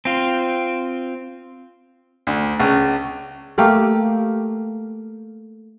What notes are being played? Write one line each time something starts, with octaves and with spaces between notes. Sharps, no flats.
C4 F4
D2
C#2
A3 A#3 G4 F5